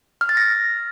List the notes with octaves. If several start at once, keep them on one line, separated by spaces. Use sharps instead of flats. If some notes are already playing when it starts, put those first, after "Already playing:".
F6
A6
A#6